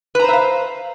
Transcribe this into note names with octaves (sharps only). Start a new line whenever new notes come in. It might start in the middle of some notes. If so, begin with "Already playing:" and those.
B4 C5 E5 F5 A#5